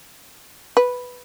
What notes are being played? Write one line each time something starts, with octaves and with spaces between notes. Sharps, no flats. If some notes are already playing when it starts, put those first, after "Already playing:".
B4